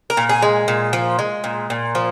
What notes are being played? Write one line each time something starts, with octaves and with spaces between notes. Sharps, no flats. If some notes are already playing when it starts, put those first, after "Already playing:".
A#4
A#2
G#4
G#3
A#2
F3
G#3
A#2
A#2
F3